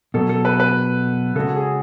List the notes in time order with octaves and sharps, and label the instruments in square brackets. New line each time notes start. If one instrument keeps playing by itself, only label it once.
[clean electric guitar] B2 F#3 B3 [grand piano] A4
[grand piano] A4
B4
B4
[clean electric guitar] C#3 G#3 C#4 F#4 [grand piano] A4
[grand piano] G#4